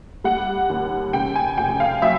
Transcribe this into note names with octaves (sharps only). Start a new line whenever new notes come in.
G3 F#5
D#2
C#3 G5
G#5
F1 G5
F5
F#3 E5